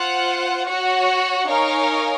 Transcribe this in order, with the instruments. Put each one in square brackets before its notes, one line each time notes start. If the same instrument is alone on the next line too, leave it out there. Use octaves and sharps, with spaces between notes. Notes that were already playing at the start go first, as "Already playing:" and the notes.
Already playing: [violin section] F4 C5 F#5
F#4 C#5 F#5
D#4 A#4 C#5 F5 G#5